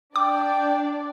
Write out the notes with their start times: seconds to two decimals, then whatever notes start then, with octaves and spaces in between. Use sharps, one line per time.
0.16 D4 D5 G5 D6